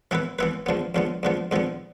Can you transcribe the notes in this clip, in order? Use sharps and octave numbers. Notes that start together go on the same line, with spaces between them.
E3 B3 E4 B4
E3 B3 E4 B4
E2 D3 F3 B3
E2 D3 F3 B3
E2 D3 F3 B3
E2 D3 F3 B3